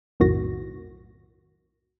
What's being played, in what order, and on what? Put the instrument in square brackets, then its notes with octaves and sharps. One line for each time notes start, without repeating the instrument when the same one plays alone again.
[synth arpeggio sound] B1 F2 A2 D#3 F#4 A#6